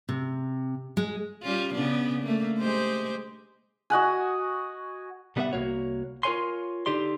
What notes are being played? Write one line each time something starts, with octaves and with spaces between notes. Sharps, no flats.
C3
G#3
G3 C#4 F4
C#3 B3 D4
A3 A#3
G#3 G4 C5
F#4 D#5 F#5 G#5
C3 G3 B3 A#4 E5 F#5
C2 C3 A#3 F#4 C#5
F4 A#4 B4 C#5 G#5 C6
D3 D#4 G4 D5 C6